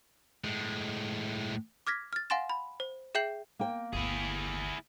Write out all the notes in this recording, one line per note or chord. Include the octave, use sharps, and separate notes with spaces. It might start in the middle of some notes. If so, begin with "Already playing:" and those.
A2 G#3
D6 F6 G#6 A#6 B6
F6 A6
F5 F#5 G#5 C6 A6 E7
B5
C5
G#4 E5 G5 G6 C7 F#7
A#3 G5
G1 D2 E4 G#4